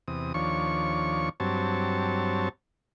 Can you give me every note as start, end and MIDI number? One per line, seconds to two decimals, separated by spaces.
0.08 0.33 40
0.08 0.33 48
0.08 0.33 87
0.34 1.29 39
0.34 1.29 53
0.34 1.29 62
0.34 1.29 73
0.34 1.29 85
1.40 2.49 43
1.40 2.49 54
1.40 2.49 60
1.40 2.49 73
1.40 2.49 81